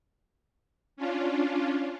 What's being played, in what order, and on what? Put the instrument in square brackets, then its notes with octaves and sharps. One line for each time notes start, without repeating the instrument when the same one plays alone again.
[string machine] C#4 D4 F4